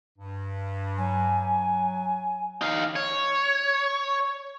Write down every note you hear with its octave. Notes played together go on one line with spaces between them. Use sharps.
G2
F#3 G#5
D#4 F5
C#5